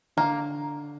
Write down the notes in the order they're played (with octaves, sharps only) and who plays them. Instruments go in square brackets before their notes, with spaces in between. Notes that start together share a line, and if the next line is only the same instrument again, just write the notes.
[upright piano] D3 [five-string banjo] A#3